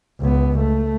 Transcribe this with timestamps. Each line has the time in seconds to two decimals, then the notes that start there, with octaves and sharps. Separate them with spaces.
0.20 C#2 B3
0.59 A3